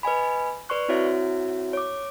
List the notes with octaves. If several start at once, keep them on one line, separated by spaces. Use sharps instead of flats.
B4 D#5 G#5 B5
B4 D5 C6 C#6 F#6
C4 E4 F#4 C#5 E5
C#5 D6